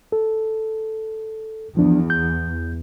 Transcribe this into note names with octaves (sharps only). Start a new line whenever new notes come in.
A4
E2 F3 D4
G6